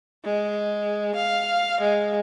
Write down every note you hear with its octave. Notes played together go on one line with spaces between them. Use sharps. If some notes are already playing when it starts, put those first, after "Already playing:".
G#3
F5
G#3